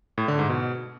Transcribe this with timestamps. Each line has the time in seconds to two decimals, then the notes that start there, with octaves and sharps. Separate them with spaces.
0.18 A2
0.28 D3
0.39 G#2
0.49 B2